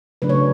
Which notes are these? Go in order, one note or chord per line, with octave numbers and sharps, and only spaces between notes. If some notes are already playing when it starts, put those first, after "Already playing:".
C#3 F#3 A3 D4 B4
C#5